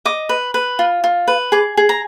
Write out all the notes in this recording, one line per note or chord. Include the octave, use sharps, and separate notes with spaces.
D#5 D6
B4
B4
F4
F4
B4
G#4 D6
G#4
A#5